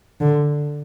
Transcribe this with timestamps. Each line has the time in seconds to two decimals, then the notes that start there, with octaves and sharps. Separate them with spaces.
0.21 D3